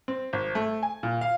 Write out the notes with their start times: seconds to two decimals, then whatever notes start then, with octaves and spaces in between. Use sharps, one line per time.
0.08 C4
0.33 G#1
0.55 A3
0.83 G#5
1.03 A#2
1.21 F5